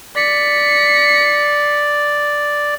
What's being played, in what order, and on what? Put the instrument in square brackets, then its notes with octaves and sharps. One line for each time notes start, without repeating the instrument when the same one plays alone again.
[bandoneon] D5 [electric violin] B6 C#7